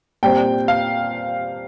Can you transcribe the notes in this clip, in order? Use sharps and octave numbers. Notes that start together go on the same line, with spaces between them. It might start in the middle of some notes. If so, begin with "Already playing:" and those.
A#2 G3 C4 G5
F5